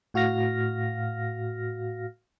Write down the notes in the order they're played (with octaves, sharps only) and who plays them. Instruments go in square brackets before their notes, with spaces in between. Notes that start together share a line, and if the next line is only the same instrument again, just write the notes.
[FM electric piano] A2 F#4 F5 F6 A#6